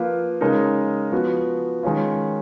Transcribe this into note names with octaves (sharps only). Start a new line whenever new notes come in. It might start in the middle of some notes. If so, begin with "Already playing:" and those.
Already playing: F3 A#3 F4 B4
C#3 G#3 D#4 A#4 C#5
F3 B3 F#4 B4
D#3 G#3 C#4 F4